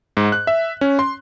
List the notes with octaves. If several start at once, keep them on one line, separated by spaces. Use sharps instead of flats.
G#2
F#6
E5
C#4
C6